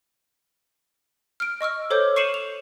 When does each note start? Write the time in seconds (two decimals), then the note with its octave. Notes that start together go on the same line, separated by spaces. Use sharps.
1.40 F6 D7
1.61 D#5 C#6 E6 F6
1.90 A4 C5 C#5 D6 G6
2.16 C#6 C7 C#7 D#7 E7 F#7
2.34 F7